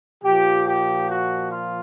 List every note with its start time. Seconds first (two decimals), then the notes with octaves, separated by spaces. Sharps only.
0.23 A#2 F3 G4
0.66 G4
1.09 F#4
1.52 F4